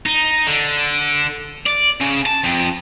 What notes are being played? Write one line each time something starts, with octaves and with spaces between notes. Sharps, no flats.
D#4
D3
D5
C#3
A5
F2